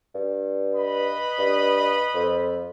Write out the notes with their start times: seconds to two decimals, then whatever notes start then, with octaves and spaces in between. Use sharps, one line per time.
0.15 G2
0.75 B4 D#5 B5
1.38 G2
2.14 F2